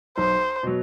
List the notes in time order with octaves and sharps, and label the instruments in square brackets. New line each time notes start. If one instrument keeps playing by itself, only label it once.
[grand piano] B1 [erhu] C5
[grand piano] B2 F#3